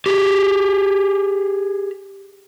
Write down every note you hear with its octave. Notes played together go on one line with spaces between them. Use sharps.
G4 G#4